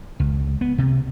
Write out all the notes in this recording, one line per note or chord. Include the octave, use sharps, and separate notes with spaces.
C#2
B3
C3